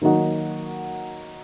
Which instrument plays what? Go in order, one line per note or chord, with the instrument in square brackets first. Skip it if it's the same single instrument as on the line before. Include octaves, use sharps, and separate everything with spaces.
[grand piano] D#3 F#3 A#3 D#4 F#4